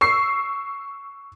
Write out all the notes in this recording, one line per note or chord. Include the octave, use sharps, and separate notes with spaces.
C#6 E6 C7